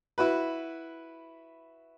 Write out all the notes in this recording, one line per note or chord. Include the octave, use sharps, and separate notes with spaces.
E4 F#4 B4